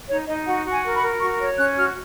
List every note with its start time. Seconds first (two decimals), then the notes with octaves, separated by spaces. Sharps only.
0.09 D#4 C#5
0.27 D#4 D#5
0.46 F#4 F#5
0.65 F#4
0.71 G#5
0.84 A#4
0.96 B5
1.03 A#4
1.21 F#4 C#6
1.40 C#5
1.58 C#4 F#6
1.78 F#4 F6